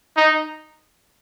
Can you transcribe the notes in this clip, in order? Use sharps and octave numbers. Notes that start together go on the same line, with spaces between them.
D#4